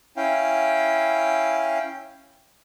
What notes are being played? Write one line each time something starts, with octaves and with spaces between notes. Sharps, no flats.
C#4 E4 F5 G5